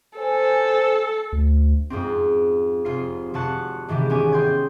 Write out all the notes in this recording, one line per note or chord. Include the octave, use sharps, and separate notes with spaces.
A4 C5 G#5
D2
F2 G#2 C4
F1 F4 C7
F1 F3 F#4 A5 F#6 C#7
G#2 C3 D#3 E3 A3 G4
G#1 B3 C#4 G#5 D6
G5 C6 D#6 G6 G#6